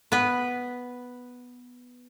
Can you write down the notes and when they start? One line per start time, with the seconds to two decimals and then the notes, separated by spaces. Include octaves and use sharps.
0.12 B3 B4